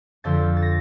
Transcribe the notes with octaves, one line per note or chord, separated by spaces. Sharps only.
F2 D3 F3 A6
A6
A#6